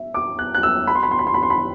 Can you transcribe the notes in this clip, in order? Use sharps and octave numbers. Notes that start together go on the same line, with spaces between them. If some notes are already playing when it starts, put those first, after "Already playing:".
Already playing: E5
D6
F#6
F#6
E6
B5
C6
B5
C6
B5
C6
B5
C6
B5